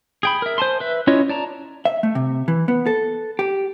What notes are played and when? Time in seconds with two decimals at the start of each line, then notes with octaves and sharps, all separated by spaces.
0.23 G#4 G5 B5
0.42 A#4 E5
0.58 C5 G#5 A5 C6
0.80 B4 E5
1.07 C#4 E4 F4 C#5 D#5
1.29 D5 A5 A#5
1.85 E5
2.03 A3
2.15 C3
2.48 E3
2.68 B3
2.86 A4
3.39 G4